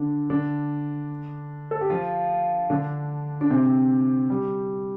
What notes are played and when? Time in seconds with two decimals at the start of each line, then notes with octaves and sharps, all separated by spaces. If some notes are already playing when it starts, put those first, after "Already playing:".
Already playing: D3 D4
0.30 D3 D4
1.71 A4
1.81 G4
1.90 F3 F4
2.70 D3 D4
3.41 D4
3.50 C3 C4
4.30 G3